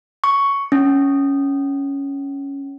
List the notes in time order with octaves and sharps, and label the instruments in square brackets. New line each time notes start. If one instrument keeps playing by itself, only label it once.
[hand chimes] C#6
C#4